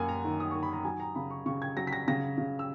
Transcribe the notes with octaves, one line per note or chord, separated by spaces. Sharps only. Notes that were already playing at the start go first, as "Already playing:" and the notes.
Already playing: F#2 A#3 F#5 G#5
A#5
D#3
D#6
D#3 C#6
B5
A#5
F#3 G#5
A#5
C#3 B5
C#6
C#3 C#6
G#6
F#3 A#6
B6
A#6
C#3 A#6
C#3
E6